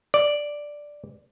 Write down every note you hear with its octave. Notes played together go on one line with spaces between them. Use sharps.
D5